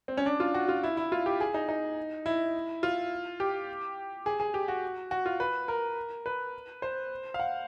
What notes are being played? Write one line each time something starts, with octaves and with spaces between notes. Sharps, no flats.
C4
C#4
D4
F4
F#4
F4
E4
E4
F4
G4
G#4
D#4
D#4
E4
F4
G4
G#4
G#4
G4
F#4
F#4
F4
B4
A#4
B4
C5
F5
F#5